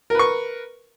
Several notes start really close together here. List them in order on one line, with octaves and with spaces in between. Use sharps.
A#4 B4 C#6